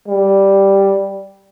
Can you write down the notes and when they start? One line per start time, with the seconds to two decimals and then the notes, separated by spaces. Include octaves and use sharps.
0.08 G3